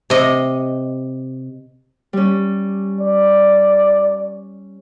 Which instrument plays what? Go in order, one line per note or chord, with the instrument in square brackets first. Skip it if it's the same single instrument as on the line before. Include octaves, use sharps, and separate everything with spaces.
[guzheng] C3 D#5
[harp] G3 C#4
[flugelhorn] D5